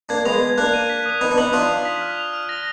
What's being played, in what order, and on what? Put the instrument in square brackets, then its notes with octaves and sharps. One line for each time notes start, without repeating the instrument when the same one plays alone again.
[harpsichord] A#3 D4 [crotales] G#6
[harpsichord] G#3 B3 [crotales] F7
[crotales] G#6
[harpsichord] A#3 D4 [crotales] F#6
[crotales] D#7
B6
D#6
[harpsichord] B3 D#4 [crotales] G#6
[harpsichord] D4
[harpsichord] B3 D#4 [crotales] F#7
[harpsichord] D4 F4 [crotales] D#7
[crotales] D#6
B6
F6
F7
F6
A#6